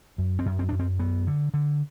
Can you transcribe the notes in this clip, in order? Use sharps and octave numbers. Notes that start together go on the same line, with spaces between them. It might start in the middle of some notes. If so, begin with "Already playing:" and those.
F#2
C4
F#2
C4
F#2 D4
C4
F#2 B3
D3
D3